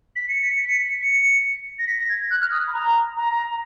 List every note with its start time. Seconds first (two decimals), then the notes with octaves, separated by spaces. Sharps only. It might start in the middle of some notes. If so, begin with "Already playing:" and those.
0.16 B6
0.29 C#7
0.42 B6
0.55 C#7
0.68 B6
1.02 C#7
1.79 A#6
1.87 B6
1.98 A#6
2.09 G#6
2.31 F#6
2.41 F6
2.51 D#6
2.67 B5
2.73 A#5
3.17 A#5